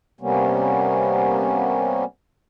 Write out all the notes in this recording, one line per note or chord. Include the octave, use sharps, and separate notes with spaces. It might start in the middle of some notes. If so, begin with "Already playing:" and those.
C3 G3 A#3 B3 C#4